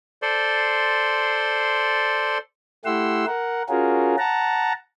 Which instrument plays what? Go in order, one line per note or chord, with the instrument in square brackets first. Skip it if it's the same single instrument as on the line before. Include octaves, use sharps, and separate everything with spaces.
[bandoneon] A4 C5 D5 C6
[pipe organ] A3 E4 G4 F#5 C6 E6
A#4 F#5
C#4 F4 F#4 G#4 A#4
F#5 A5 A#5